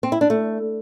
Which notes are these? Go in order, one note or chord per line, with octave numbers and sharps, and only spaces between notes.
C4
E4
D4
A3